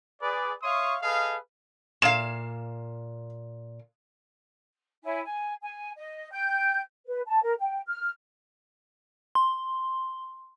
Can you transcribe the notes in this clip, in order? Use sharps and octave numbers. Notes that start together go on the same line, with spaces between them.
G#4 B4 D5
C#5 E5 F5 C6 C#6 D#6
G#4 A4 B4 D#5 F5
A#2 F5 E7
E4 C#5 G#5
G#5
G#5
D#5
G5 G6
B4
A5
A#4
G5
F6
C6